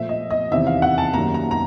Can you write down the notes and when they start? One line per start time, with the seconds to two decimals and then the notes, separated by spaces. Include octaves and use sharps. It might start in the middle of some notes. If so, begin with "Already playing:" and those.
Already playing: A#2 F3 A3 E5
0.09 D#5
0.30 D#5
0.52 E2 C3 D#3 E5
0.67 F5
0.82 F#5
0.98 A5
1.14 F#2 D#3 G3 A#3 A#5
1.34 A#5
1.51 A#5